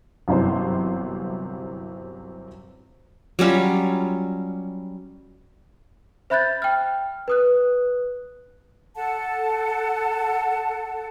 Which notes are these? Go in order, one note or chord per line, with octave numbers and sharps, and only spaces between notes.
G1 F#2 C3 E3 C5
F#3 G3 C#4 F4
C5 E5 B5 F#6 G6 A6
G5 F6
B4 D#6 F#6
A4 F#5 A5